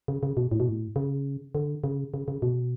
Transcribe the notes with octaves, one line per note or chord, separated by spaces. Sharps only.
C#3
C#3
B2
A2
B2
A2
C#3
D3
C#3
C#3
C#3
B2